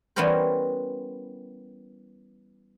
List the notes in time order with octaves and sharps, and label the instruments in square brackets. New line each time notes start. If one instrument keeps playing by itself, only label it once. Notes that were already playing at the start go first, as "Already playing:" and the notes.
[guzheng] E3 G3 B3 C#4 A#4 C5